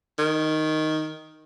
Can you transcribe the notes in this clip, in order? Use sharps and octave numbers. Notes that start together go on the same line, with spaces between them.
D#3